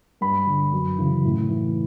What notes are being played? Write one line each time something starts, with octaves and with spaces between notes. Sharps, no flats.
G2 B5
D3
F#2
C#3 E3
A2
E3